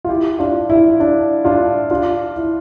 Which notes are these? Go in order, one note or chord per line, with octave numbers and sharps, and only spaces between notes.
F4
E4 G4
D4 F4
E4
D4
D4 F4
D4 F4
E4